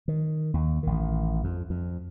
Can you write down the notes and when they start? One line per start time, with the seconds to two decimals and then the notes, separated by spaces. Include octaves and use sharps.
0.08 D#3
0.54 D#2
0.83 A1 D#3
1.44 F2
1.70 F2